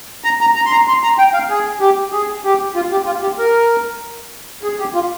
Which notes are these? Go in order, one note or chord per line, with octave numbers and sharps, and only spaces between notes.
A#5
A#5
A#5
C6
A#5
C6
A#5
G5
F5
G#4
G4
G#4
G4
F4
G4
F4
G4
A#4
G#4
G4
F4